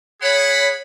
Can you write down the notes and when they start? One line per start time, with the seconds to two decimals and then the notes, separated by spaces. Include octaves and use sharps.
0.21 G#4 C#5 F#5 B5